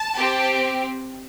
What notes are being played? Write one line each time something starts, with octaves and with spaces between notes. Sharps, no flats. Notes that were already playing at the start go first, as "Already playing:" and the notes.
Already playing: A5
C4 G4